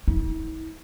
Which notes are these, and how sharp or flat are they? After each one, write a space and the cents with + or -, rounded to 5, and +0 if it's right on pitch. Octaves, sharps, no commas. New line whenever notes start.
E4 -45